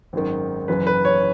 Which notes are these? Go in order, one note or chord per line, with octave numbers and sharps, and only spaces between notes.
G#1 F#2 D#3
F#1 F#2 E3 B4
B4
C#5